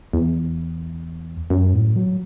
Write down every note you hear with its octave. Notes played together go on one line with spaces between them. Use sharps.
E2
F#2
A2
F#3